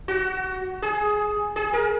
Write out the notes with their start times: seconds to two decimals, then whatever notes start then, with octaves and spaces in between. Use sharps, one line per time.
0.08 F#4
0.82 G#4
1.56 G#4
1.73 A#4